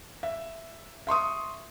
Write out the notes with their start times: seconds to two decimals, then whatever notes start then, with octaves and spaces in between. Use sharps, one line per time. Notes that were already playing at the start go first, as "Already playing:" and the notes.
0.23 E5
1.07 E5 C6 C#6 D#6